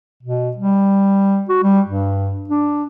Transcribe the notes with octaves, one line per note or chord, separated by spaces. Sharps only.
B2
G3
F#4
G3
G2
D4